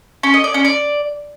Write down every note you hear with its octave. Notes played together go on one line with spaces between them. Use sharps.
C#4
D#5
D5
C#4
D5